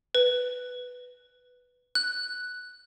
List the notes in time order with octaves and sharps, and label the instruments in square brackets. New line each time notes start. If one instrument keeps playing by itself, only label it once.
[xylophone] B4
F#6